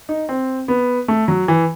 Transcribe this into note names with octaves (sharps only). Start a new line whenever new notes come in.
D#4
C4
B3
A3
F#3
E3